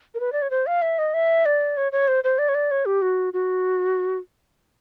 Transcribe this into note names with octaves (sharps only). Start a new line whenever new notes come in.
A#4
B4
D5
C#5
C5
F5
E5
D#5
E5
D5
C#5
C#5
C5
C5
D5
C#5
D5
C#5
G4
F#4
F#4